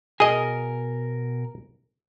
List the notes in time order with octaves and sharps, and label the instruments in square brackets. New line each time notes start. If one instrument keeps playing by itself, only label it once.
[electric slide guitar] B2 A#4 G#5 [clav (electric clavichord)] G#4 D#5